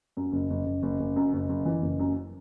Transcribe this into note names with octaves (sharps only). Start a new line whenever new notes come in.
F#2
F#1
F#1
F#1
F#1
F#1
F#2
F#1
F#1
E3
F#1
F#2